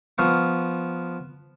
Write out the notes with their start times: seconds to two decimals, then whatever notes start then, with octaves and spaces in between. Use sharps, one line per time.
0.18 F3 B3 F5 C#6